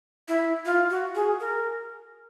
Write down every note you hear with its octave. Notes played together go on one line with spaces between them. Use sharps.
E4
F4
F#4
G#4
A#4